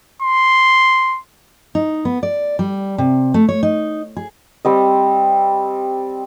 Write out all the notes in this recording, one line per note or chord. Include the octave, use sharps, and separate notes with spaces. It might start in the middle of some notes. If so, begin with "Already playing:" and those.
C6
D#4
B3
D5
G3
C3
A3
C#5
D#4
G#4
G3 C4 D#5